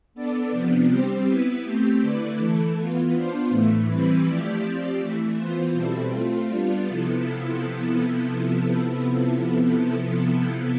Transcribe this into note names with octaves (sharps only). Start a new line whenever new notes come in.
B3 D4 A4 D5
C3 F3 B3 D4
G3 C4 G4 C5
B3 E4 B4
A3 C4 G4
D3 A3 E4 B4 D5
E3 A3 E4 A4
E3 B3 F4
B3 D4 F4 C5
A2 E3 A3
E3 G3 C4 E4 B4
F3 A3 E4 G4 D5
F3 C4 G4 D5
E3 A3 E4
E3 B3 F4 C5
B2 G3 C4 E4 A4
A3 C4 F4
G3 B3 D4 F4
C3 F3 B3 E4 A4